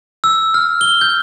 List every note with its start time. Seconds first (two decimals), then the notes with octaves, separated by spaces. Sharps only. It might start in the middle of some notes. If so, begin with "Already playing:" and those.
0.24 E6
0.54 F6
0.81 G7
1.01 G6